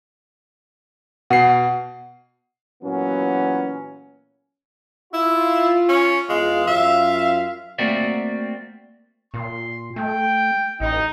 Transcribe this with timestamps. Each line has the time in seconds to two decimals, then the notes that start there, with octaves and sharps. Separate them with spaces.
1.30 B2 F#5 C7
2.83 A#2 E3 F#3 A#3 B3 C#4
5.13 E4 F4
5.89 C#4
6.29 E2 G#3 F4 F5
6.67 F#2 F4 E5 F5
7.78 A3 A#3 C4 F#4 D5 E5
9.34 A#2 C6
9.96 A3 G5
10.80 A1 D#4